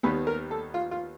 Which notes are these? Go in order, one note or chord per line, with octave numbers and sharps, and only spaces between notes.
D#2 D#3 G3 B3 B4
A#4
A4
F4
F4